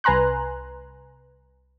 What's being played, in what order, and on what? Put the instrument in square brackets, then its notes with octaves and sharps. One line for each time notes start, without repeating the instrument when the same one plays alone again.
[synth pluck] C2 B4 G#5 A#5 C6 F#6